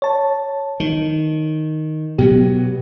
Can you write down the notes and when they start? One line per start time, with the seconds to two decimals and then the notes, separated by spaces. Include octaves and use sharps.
0.02 C#5 A5
0.80 D#3
2.18 B2 F#3 B3 G4